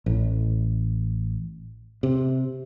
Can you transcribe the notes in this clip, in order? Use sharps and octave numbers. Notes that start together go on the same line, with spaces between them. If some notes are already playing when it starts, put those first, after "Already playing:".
A1
C3